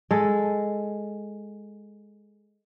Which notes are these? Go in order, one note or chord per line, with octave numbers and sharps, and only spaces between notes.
G#3 A4